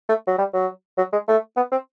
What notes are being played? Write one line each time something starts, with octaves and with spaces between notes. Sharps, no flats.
A3
F#3
G3
F#3
F#3
G#3
A3
B3
C4